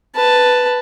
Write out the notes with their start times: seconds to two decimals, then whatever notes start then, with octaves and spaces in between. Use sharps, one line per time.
0.16 B4 A5